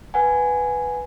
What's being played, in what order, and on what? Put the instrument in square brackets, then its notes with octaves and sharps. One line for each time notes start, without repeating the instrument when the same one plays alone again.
[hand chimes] B4 F#5 G#5